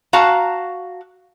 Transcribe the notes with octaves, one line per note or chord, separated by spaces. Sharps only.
F#4 F5 A5 A#5